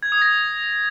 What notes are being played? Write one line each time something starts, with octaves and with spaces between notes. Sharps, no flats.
G#6
D#6
A#6